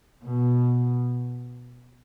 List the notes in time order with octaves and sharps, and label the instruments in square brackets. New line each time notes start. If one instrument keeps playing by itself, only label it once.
[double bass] B2